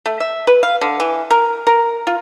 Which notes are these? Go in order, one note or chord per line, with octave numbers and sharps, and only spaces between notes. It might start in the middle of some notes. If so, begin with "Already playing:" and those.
A3
E5
B4
F5
D3
E3
A#4
A#4
F4